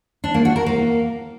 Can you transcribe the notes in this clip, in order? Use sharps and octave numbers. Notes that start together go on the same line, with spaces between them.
D4
A#3
F#4
A#4
A#3